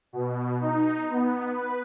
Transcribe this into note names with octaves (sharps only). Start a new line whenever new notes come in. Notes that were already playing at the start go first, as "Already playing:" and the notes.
B2
D#4
B3
B4